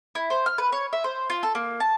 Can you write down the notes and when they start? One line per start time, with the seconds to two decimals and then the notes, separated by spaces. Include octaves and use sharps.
0.15 E4
0.30 C5
0.46 F6
0.58 B4
0.72 C#5
0.93 E5
1.04 C5
1.30 F4
1.43 A4
1.55 A#3
1.80 A5